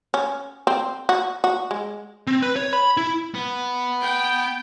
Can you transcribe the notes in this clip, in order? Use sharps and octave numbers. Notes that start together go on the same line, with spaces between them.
C#4
C4
F#4
F#4
G#3
C4
B4
C#5
B5
E4
B3
G5